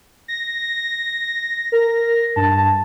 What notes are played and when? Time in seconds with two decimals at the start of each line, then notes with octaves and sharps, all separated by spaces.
0.28 A#6
1.72 A#4
2.36 G2 A5